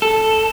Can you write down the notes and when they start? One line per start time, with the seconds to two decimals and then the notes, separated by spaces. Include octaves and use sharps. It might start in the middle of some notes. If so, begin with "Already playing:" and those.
0.02 A4